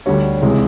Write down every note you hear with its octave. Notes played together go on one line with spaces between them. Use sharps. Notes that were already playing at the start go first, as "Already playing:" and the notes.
D2 D3 G3 C#5
C#2 C3 E3 G#3